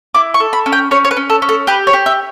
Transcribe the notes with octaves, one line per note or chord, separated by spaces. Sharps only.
E4 D6
C#6
A4
B5
C#4
G5
C#4 C#5
C#5
B4
C#4
A4
C#4
A4
G4 B4
C#5
G4
E5